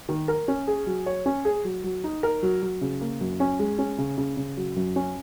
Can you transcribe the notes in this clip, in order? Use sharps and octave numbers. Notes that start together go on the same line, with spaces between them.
D#3
A#4
C#4
G#4
F#3
C#5
C#4
G#4
F#3
F#3
D#4
A#4
F#3
F#3
C#3
A#3
F#2
C#4
G#3
C#4
C#3
C#3
C#3
F#3
F#2
C#4